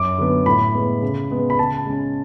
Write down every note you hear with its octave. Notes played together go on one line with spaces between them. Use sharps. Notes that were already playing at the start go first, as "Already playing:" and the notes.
Already playing: F#2 D6
D3 F#3 B3
A2 B5
G#3 B3
C#3
G#3 B3
B5
C#3 A5
G#3 C#4